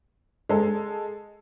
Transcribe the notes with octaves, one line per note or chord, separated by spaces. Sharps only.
G#3 A4